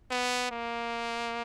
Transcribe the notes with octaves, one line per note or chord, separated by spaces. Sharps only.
B3
A#3